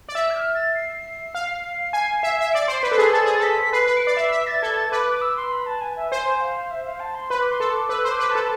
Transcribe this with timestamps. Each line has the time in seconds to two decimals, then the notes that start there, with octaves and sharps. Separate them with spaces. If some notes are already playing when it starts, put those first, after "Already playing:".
0.09 D5
0.15 E5 E6
0.30 G#6
0.35 F6
0.55 A6
0.75 C7
1.35 F5
1.93 G#5
2.23 E5
2.41 E5
2.53 D5 D7
2.68 C5 C7
2.83 B4 B6
2.92 A4
2.98 G#4 C7
3.13 A4 A6
3.26 G#4
3.34 A6
3.39 A4 B6
3.62 B6
3.73 B4 C7
3.87 B4
3.97 D7
4.03 D5 C7
4.17 E5
4.32 E5 B6
4.47 A6
4.62 A4 G#6
4.77 A6
4.92 B4 D6
5.07 D6
5.22 E6
5.37 C6
5.52 B5
5.66 A5
5.81 G#5
5.96 E5
6.11 C5 G#5
6.41 F5
6.71 E5
6.85 F5
7.00 A5
7.15 C6
7.30 B4 B5
7.41 D6
7.50 C6
7.60 A4
7.70 D6
7.89 B4 E6
8.04 C5
8.10 D6
8.19 B4
8.30 A5
8.35 A4